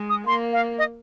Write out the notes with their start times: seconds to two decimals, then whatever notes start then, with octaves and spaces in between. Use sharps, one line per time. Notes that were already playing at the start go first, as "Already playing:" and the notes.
Already playing: G#3
0.10 D#6
0.27 A#3 C6
0.53 F5
0.78 D#5